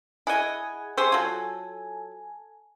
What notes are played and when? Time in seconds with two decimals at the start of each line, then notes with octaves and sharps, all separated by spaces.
0.27 E4 G#4 D#5 F#5 G#5
0.97 G4 G#4 C5 E5 C#6 E6
1.12 F#3 F4 A4 G#5